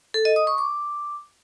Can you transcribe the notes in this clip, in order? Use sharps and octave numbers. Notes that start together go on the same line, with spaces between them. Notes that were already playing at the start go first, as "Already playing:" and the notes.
A4
D#5
D#6
C#6
D6